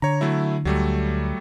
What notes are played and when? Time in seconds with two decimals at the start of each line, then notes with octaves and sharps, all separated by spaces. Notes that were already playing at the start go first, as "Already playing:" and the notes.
0.02 D3 C#5 A#5
0.21 F#3 A3 E4
0.65 D2 F#3 G3 A3